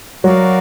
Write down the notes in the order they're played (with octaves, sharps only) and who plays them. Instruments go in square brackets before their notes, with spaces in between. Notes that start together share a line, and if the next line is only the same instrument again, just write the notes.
[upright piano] F#3 [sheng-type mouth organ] F#4 A#4 D5 F5